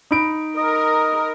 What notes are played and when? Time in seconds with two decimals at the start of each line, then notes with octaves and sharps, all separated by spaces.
0.11 D#4 B5 D7
0.57 A#4 D#5